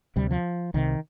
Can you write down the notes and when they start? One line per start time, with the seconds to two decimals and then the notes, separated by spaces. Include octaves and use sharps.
0.16 D2 C3 G3
0.31 F3
0.74 C2 C3 D#3